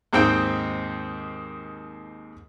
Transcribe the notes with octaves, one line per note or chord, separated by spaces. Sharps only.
D#2 G#2 C4 D#4 G5